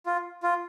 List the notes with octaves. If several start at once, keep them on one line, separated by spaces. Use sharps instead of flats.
F4
F4